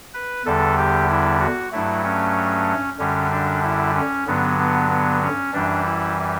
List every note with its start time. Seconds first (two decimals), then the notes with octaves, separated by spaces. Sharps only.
0.14 B4
0.45 E2 D3 G3 A4
0.78 G4
1.09 E4
1.40 F#4
1.72 G2 F#3 A3 E4
2.04 C#4
2.99 F#2 D3 G3 C#4
3.31 D4
3.63 E4
3.96 C#4
4.27 G2 D3 F#3 B3
4.58 B3
4.91 B3
5.22 C#4
5.53 F#2 E3 G3 D4
5.85 E4